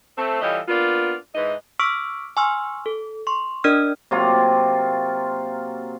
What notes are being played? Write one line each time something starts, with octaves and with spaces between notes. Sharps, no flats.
A3 C4
E3 G3 F4 A4 C#5 D#5
A#3 B3 D4 F4
G#2 E3 D#5
C#6 D6 E6 F6 B6 D7
G#5 C6 C#6 E6 F6
A4
C6 C#6
D4 A#4 D5 D#5 F6
C3 F#3 A#3 F4